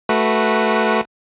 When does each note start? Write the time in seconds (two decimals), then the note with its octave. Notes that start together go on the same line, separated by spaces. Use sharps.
0.09 A3 F#4 B4